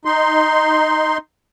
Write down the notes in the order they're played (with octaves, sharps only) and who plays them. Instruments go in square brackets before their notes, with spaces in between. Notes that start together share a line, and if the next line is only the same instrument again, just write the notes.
[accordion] D#4 C6